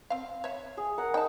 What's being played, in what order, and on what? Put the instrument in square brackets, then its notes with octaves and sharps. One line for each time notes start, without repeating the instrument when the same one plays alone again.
[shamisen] C4 F5
C#5 E5
[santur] G#4
A#4 F#5
[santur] D#4 [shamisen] G5 A5